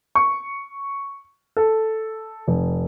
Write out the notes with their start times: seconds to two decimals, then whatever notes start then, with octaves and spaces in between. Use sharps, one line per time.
0.15 C#6
1.57 A4
2.48 F1